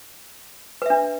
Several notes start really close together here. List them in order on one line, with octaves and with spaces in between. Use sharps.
B4 E5 D4